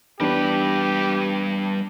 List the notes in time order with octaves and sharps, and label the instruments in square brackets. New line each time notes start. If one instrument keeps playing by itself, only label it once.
[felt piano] E2 B3 D4 [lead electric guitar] G3 B4 [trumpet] G4